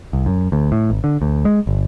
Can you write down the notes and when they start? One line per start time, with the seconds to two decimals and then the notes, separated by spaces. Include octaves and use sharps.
0.13 C2
0.26 F#2
0.52 D2
0.72 A2
0.90 G#1
1.04 D3
1.22 D2
1.45 G#3
1.67 G1